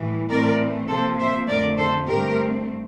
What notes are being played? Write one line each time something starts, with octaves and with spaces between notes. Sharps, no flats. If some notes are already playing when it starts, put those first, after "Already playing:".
Already playing: A2 E3 G3
A2 E3 A3 C4 A#4 D5
C3 F3 A#3 A4 C5
C5 E5
F2 D3 A3 A#4 D5
A4 C5
G2 D3 A3 C4 G4 A#4